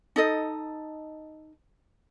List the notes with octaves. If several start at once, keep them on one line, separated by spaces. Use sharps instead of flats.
D#4 A4 D#5